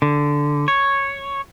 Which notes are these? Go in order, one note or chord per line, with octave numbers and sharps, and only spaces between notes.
D3
C#5